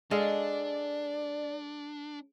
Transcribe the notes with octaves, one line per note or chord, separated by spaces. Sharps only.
G#3 D4 A4 D5 F5